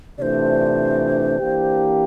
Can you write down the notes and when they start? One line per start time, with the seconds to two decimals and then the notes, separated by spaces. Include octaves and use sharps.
0.18 C3 E3 A3 D4 F4 C5 D5
1.38 E3 A#3 D4 G4